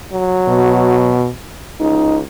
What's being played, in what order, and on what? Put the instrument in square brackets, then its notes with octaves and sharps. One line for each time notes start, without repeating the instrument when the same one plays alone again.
[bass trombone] F#3
[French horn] B2
[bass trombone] C#2 [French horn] D#4